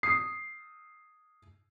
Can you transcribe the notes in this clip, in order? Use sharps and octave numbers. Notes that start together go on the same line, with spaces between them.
D#6 C7